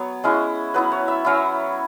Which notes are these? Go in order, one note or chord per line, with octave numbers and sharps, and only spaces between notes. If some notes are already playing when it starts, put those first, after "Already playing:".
Already playing: F#3 B3 C#5
G#3 C#4 E4
F#3 B3 E4 B4
C#5
E5
F#3 C#4 E4